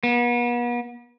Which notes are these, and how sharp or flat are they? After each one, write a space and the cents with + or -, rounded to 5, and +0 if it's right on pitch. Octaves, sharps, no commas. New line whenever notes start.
B3 -40